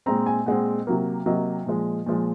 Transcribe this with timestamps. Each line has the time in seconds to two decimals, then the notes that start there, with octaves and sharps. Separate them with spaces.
0.06 A#2 G#3 C4 A#5
0.26 G#5
0.46 A#2 G#3 C4 F#5
0.87 C3 F#3 A#3
1.26 C3 F#3 A#3 D#5
1.66 A#2 F3 G#3
2.06 A#2 F3 G#3